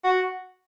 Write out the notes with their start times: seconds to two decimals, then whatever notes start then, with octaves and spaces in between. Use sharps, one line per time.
0.04 F#4